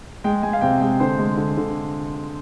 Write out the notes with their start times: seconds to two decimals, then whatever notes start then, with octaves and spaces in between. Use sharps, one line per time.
0.24 G#3 G5
0.43 G#3 G#5
0.53 F5
0.61 C3 G5
0.81 G#3 G5
1.00 D3 C5
1.19 G#3
1.37 D3
1.57 D3